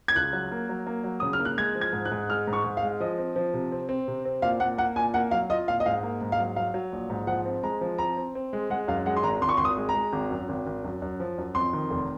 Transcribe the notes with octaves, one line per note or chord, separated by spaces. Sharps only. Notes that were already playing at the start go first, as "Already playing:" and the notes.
G#6
C#2 F#6
F#3
A#3
F#3
A#3
F#3
C#3 D#6
F6
A#3
F#6
G#3 G#6
F3
G#6
G#2
F#6
G#2
G#3 F6
G#2
C#6
G#2
F5
G#3
F3 D#5
C4
F3
C3
C4
C4
C3
C4
A#2 F5
A#2 F#5
A#3 F#5
A#2 G#5
A#3 F#5
F#3 F5
F4 D#5
A#2 F5
D#5
G#2 F5
A#3
G#2
F5
F#3
F#3 F5
F#3
A#1
G#2
F3 F#5
C4
G#3 A#5
F3
C4 A#5
C4
C4
G#3
G#3 F#5
F#2 F5
G#3 F#5
C6
G#1 A#5
G#1 C6
C#6
G#1 C6
D#6
G#3
A#5
G#3
G#1
F#2
G#1
G#1
F#2
F#2
F3
F#2
F2 C6
D#3
F1